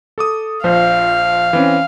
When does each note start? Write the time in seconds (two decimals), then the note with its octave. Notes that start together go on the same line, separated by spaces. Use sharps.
0.18 A4 D6 D#6
0.64 A#1 F3 C5 F5
1.53 E3 C4 C#4